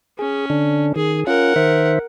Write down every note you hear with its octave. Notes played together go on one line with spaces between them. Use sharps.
C#4 G#4
D3 D4
D#3 G#4
C#4 F4 A#4 F#5
D#3 C5 E5